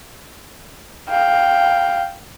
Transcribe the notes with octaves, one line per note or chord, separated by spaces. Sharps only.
F5 G5